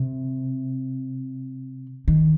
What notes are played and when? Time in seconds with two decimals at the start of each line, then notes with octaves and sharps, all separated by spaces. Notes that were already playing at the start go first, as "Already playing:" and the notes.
Already playing: C3
2.08 D#3